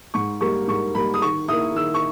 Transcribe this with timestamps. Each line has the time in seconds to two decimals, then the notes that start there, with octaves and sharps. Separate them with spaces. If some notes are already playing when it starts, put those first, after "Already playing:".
0.14 G#2 C#6
0.41 G3 A#3 C#6
0.68 G#2 C#6
0.95 G3 A#3 B5
1.14 D#6
1.22 D#3 C#6
1.48 A#3 E4 D#6
1.75 D#3 E6
1.94 C#6